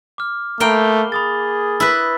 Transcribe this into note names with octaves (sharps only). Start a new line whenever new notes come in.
D6 F6
A3 A#3 G5 B5 G7
G#4 B5 D#6 A6
E4 B4